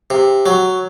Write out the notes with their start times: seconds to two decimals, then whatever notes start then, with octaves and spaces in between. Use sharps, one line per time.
0.10 C3
0.46 F#3